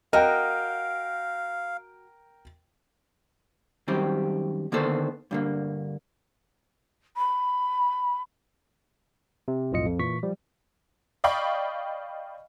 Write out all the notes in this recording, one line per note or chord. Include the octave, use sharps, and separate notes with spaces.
F#4 A#4 D#5 F5 G5
F#2 D#3 G3 C4 G4
D3 D#3 A#3 B3 A4 C5
G2 D3 A#3
B5
C3
B1 F2 A2 F4 D#5 C#7
F2
A#2 E3 C#6 B6
F3 G3
D5 D#5 F5 G5 B5 C#6